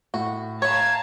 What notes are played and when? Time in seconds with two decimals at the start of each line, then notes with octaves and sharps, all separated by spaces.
0.14 A2 F#4
0.62 B4 C#5 F5 A5 A#5 G#6